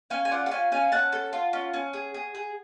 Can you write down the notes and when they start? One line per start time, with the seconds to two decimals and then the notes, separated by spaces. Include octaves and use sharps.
0.10 C#4 F5 G#5
0.25 G#5
0.31 F4 D5 F#5
0.46 F#5
0.51 C#4 F5 G#5
0.72 C#4 F5 G#5
0.92 C#4 F#5 A5
1.12 A4
1.33 F4
1.53 C#4
1.74 C#4
1.93 G#4
2.14 G#4
2.35 G#4